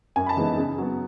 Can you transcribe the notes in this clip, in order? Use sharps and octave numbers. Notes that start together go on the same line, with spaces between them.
F#2 G#5
B5
A5
E3 G#3 B3 D#4
C#3
F#3 B3